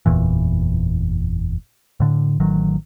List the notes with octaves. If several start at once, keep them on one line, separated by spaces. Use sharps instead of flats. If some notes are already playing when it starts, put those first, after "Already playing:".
F#1 E2 A#2 E3
A2 D3
A1 D#3 F#3